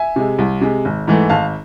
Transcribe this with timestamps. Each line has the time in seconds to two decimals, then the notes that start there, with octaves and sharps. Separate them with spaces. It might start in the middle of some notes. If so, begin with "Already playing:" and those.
Already playing: E5 G#5
0.16 C3 G#3
0.39 C2
0.61 C3 G#3
0.85 G#1
1.08 G#2 E3 A3
1.30 G#1 F5 A5